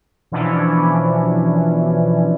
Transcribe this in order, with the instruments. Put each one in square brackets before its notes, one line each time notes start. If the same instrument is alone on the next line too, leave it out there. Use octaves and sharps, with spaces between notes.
[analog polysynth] B2 E3 F3 C#4 D4 E4